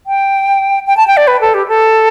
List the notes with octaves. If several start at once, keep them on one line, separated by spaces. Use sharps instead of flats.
G5
G5
A5
G5
D5
B4
A4
G4
A4